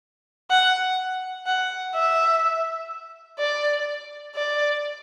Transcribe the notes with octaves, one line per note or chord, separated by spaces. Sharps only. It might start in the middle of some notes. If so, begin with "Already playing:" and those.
F#5
F#5
E5
D5
D5